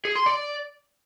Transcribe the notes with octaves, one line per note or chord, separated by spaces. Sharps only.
G#4
C6
D5